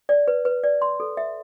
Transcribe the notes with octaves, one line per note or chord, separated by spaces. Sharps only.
D5
B4
B4
D5
C6
A4
E5